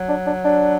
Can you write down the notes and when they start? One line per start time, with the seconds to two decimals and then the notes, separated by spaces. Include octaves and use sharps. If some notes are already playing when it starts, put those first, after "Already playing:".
Already playing: F#3
0.09 D4
0.27 D4
0.45 D4